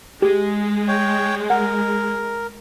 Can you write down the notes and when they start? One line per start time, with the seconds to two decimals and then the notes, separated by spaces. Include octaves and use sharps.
0.22 G#3 G4
0.88 C#5 G5
1.50 A#4 F#5